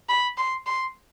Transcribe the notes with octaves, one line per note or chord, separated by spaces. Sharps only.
B5
C6
C6